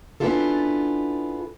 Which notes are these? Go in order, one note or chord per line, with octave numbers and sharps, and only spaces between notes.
B3 C#4 D4 E4 F4 A4